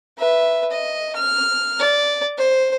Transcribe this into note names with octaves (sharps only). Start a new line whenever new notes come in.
B4 E5
D#5
F6
D5
C5